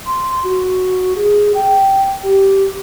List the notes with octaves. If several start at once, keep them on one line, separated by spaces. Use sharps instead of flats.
C6
F#4
G#4
G5
G4